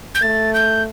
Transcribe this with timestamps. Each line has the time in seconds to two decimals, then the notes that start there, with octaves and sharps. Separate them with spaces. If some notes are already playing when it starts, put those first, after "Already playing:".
0.15 G6
0.22 A3 A6
0.54 G6